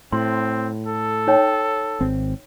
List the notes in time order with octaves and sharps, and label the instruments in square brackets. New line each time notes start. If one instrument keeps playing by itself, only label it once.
[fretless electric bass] A2 [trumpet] C4 [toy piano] C6
[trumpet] A4
[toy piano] D#4 C#5 G5
[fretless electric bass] G#1 C4